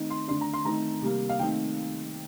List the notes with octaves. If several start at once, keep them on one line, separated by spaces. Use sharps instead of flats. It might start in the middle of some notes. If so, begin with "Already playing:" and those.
Already playing: D#3 A3 C4 D#4
C6
D3 A3 D4 C6
A#5
C6
D#3 A3 C4 D#4 A#5
C3 G3 A#3
F5
D#3 A3 C4 D#4 G5